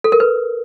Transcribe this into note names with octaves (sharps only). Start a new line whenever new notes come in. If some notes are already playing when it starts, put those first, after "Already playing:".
A4
A#4
B4